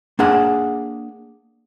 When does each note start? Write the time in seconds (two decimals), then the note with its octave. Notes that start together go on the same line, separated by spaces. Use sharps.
0.19 A#3 D4 G#4 F#5